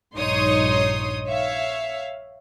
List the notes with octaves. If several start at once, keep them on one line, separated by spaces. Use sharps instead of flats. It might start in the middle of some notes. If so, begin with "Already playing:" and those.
A#1 G2 D#4 C#5 C6 D#6
C#5 E5 F5